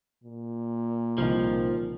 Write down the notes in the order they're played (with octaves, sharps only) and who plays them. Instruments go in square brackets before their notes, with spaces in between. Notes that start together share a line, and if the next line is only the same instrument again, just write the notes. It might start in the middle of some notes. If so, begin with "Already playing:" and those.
[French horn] A#2
[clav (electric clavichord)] C2 D#3 [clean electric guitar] F3